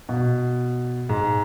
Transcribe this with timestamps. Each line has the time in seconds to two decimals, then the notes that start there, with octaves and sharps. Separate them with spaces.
0.09 B2
1.09 G#2